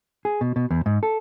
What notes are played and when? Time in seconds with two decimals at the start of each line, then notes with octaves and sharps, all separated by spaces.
0.25 G#4
0.41 B2
0.56 B2
0.71 E2
0.86 G#2
1.03 A4